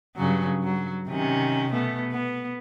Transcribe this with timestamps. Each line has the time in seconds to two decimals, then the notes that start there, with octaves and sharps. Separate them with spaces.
0.16 G2 C#3 F#3
0.63 F#3
1.08 C3 D#3 C#4
1.71 B2 A3 B3
2.12 B3